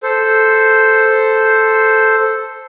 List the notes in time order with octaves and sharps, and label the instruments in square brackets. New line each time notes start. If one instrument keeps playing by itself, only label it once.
[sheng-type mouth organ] A4 C5